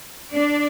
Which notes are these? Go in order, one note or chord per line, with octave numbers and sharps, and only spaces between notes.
D4 D5